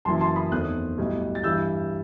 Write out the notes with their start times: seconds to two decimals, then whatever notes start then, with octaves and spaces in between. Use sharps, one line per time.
0.05 F#1 F#2 E3 A5 C6
0.21 A5 C6
0.36 B5 D#6
0.52 E2 D#3 A3 C4 D#6 F#6
0.97 B1 A2 G3
1.35 A6
1.43 G2 E3 G3 E6 G6